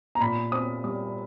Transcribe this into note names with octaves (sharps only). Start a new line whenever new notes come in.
A#5
A#2 B5
C4 D#6
G3 D#6